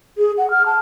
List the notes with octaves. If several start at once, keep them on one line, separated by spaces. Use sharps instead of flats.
G#4
F#5
F6
A5